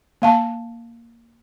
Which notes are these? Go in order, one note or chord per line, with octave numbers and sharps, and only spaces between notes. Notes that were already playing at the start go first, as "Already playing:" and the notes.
A#3 F5 A5